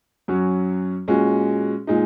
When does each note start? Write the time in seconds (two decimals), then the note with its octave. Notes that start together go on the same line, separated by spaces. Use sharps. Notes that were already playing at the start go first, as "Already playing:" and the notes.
0.28 F#2 F#3 C#4 F#4
1.08 A#2 G#3 C#4 F#4
1.87 A#2 G#3 D#4